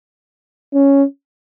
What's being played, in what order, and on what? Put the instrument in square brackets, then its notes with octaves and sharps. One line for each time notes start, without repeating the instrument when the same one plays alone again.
[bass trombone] C#4